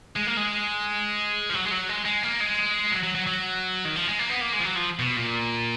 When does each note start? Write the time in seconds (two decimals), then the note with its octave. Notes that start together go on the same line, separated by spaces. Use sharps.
0.16 G#3
0.27 A#3
0.37 G#3
1.50 F3
1.54 F#3
1.66 G#3
1.71 F#3
1.89 G#3
2.05 G#3
2.23 A#3
2.40 G#3
2.92 F#3
3.03 F#3
3.15 F#3
3.27 F#3
3.85 D#3
3.96 F3
4.07 G#3
4.19 A#3
4.30 B3
4.41 A#3
4.53 G#3
4.61 F3
4.65 F#3
4.76 F3
4.99 B2
5.16 A#2